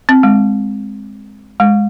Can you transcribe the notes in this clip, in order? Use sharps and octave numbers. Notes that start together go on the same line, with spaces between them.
C4
G#3
G#3